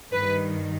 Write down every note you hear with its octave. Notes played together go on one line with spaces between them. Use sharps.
G2 D#3 B4